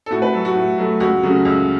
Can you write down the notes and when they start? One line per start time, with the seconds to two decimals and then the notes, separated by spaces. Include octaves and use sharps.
0.06 A4
0.11 A2 F#4
0.22 B4
0.33 F#3 A3 A4
0.45 F#4
0.55 A2
0.78 F#3 A3
1.00 C#2 F#4
1.23 C#3 F#3 A3
1.45 C#2